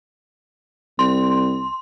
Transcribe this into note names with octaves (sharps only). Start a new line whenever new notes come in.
C2 C6